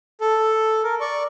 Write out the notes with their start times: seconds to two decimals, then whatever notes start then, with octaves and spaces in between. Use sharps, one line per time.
0.21 A4
0.84 A#4
1.01 D5 C#6